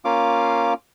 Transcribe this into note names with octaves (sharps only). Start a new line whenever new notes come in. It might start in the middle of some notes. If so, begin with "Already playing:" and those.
A#3 C#4 F4 F5 D6